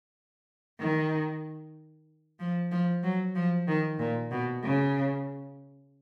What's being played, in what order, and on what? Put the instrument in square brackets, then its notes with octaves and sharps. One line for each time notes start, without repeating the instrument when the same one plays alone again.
[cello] D#3
F3
F3
F#3
F3
D#3
A#2
B2
C#3